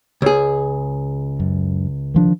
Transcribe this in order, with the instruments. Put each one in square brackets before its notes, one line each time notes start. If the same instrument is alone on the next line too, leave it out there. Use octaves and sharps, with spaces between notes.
[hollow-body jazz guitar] C#2 G#4
[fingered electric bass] F#2
D#3 F3 D4